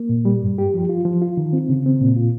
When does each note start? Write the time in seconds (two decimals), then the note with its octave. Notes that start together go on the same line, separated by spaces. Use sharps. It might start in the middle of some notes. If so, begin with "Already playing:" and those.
Already playing: A#3
0.09 A#2
0.25 G3
0.42 G2
0.58 G4
0.74 F3
0.89 F4
1.05 F3
1.22 F4
1.37 D#3
1.53 C4
1.69 C#3
1.86 C4
2.01 A#2
2.16 F4